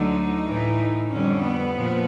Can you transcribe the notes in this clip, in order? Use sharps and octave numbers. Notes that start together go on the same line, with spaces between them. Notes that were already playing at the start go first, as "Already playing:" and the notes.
Already playing: D2 D3 F#3 A3 D#4
A2 E3 A3
F2 D3 G3 C#4
B3
A#2 F3